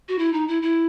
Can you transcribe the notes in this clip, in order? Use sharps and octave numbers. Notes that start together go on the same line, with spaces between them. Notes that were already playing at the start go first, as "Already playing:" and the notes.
F#4
E4
D#4
E4
E4